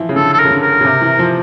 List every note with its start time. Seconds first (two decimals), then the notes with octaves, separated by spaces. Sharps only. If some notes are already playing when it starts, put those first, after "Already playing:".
Already playing: E3 F3
0.09 C#3
0.16 D3 A4
0.33 A4
0.39 A#4
0.45 C#3
0.51 D3
0.62 A#4
0.81 C#3
0.85 C3
1.02 E3
1.19 F3